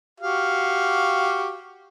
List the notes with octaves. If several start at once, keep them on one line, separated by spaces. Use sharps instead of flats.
F#4 G4 F5